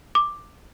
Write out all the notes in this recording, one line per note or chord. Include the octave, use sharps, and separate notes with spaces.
D6